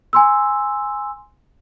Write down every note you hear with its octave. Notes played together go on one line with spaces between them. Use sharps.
G#5 C6 E6